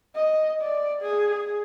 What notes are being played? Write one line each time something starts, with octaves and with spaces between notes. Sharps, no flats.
D#5
D5
G#4
G#4